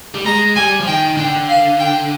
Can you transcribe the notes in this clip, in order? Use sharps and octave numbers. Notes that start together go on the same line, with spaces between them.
G3
G#3 A#5
G3 G#5
F3
D#3 G5
D3 G5
F5
G5